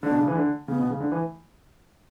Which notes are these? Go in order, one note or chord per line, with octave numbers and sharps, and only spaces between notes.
D3 D4
B2
C#3
E3
D3
C#3 B3
B2
C#3
D3
E3